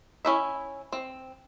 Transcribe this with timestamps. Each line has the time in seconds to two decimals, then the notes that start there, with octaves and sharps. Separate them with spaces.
0.25 C#4 E4 E5
0.92 C4